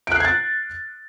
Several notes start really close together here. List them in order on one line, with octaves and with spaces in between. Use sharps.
D7 F#6 C7 G#6 A6